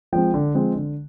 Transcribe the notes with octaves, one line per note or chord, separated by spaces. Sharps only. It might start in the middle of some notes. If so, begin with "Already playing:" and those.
F3 G#3 C4 G5
D3
F3 G#3 C4
D3